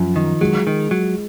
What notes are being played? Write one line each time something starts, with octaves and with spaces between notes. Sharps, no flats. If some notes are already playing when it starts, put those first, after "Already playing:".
Already playing: F#2 F3
D#3
F#3 G#3
D#3
F#3